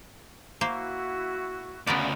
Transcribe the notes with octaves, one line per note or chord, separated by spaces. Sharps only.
A#3 E4 F#4 C5
D2 C#3 B3 A#4 D5